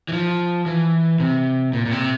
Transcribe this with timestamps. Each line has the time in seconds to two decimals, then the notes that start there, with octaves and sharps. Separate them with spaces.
0.09 E3
0.13 F3
0.66 E3
1.20 C3
1.73 A#2
1.86 A#2
1.91 C3